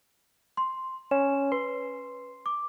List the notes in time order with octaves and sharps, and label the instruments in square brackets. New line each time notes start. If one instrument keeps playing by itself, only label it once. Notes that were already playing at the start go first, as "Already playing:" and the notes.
[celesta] C6
[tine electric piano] C#4 C#5 [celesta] E7
[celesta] B4 [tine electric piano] C6
[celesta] D6